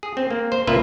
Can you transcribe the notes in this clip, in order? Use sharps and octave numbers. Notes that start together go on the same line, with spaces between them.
G#4
C4
A#3
C5
C2 A#2 A#3 F4 B4 E5